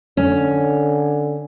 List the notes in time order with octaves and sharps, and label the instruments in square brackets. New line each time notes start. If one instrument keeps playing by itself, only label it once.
[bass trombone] D3 [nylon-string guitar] C#4